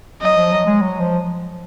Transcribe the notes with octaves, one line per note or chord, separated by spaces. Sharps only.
F#3 D#5
F3
F#3
G#3
F#3
F3